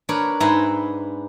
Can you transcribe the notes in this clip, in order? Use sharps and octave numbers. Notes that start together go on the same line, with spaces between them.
D4 A#4 B4 C#5
G#2 B4 E5 G#5 A#5 C6